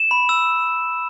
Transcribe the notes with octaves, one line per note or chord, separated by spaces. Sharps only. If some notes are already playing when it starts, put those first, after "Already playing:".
Already playing: E7
B5
E6